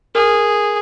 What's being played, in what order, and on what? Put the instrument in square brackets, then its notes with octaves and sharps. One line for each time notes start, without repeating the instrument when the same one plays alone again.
[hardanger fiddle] G#4 [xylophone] A#4